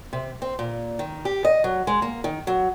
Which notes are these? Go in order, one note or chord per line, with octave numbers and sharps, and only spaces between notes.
C3
C4
A#2
D#3
G4
D#5
F#3
G#3
A#3
D#3
F#3